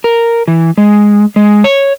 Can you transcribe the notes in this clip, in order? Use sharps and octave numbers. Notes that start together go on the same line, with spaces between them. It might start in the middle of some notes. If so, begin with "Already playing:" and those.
A#4
E3
G#3
G#3
C#5